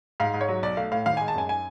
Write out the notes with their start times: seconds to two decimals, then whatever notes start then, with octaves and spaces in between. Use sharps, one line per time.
0.20 G#2 F5
0.34 G#2
0.41 C#5
0.49 F#3
0.63 B1 D5
0.77 A3 F5
0.92 A2 F5
1.06 G#1 F5
1.17 G#3 G#5
1.28 A5
1.35 F#2 G#5
1.49 G#5